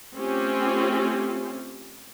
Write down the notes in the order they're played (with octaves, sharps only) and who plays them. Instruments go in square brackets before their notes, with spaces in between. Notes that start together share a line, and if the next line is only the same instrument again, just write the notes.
[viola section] A3 C4 C#4 F4 G4